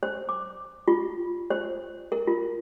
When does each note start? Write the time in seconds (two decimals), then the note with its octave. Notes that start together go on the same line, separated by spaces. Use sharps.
0.03 C5
0.29 D6
0.88 F4
1.50 C5
2.12 A#4
2.27 F4